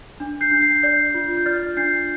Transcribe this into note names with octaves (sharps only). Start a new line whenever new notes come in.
D4
G6 C7
D4
C7
D5 G6 C7
F4
G6
D5 F6 A6
D4 G6 C7